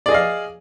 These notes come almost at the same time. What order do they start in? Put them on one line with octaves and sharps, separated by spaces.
D5 G#4 D#5 F5